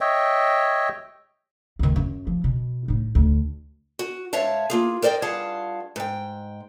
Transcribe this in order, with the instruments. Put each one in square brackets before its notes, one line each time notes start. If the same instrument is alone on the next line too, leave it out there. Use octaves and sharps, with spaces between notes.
[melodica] C#5 D#5 E5 G5
[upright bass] D2 D#3
F#2
F3
B2
A2 D#4
D2
[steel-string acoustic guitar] F#4
G#2 C#5 E5 F5 A5
A#3 F4 G#4
A#4 C5 D5 D#5 G5
G2 F4 G#4 F#5 A5
G#2 G5